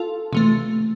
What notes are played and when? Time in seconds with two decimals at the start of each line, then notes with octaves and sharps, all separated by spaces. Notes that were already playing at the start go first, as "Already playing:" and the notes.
Already playing: F4 A4
0.33 C3 E3 A3